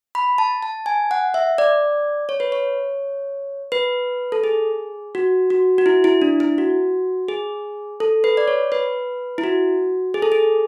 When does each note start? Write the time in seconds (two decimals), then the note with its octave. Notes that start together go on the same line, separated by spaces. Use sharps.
0.15 B5
0.38 A5
0.62 A5
0.86 G#5
1.11 F#5
1.34 E5
1.58 D5
2.29 C#5
2.40 B4
2.52 C#5
3.72 B4
4.32 A4
4.44 G#4
5.15 F#4
5.50 F#4
5.78 F#4
5.86 E4
6.04 E4
6.22 D4
6.40 E4
6.58 F#4
7.28 G#4
8.00 A4
8.24 B4
8.37 D5
8.48 C#5
8.72 B4
9.38 E4
9.44 F#4
10.14 G#4
10.22 A4
10.32 G#4